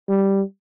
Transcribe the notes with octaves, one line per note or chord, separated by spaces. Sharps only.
G3